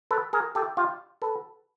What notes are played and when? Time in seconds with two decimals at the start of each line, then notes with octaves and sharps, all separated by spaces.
0.11 A4 B4
0.33 G#4 A#4
0.55 G4 A4
0.77 F4 G4
1.22 A4 B4